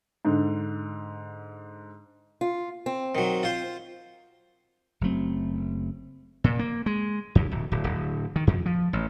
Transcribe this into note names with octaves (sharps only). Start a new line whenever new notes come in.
G#2 D3
F4
C4
D#3 F#3
F4 C5
F#1 F#3 A3 C4
A#2
A#3
G#3
D#2
D1
D1
D1
D#3
F2
F3
A1